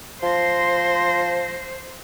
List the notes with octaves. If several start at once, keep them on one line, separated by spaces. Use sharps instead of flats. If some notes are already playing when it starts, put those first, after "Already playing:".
F3 C5 C6 A#6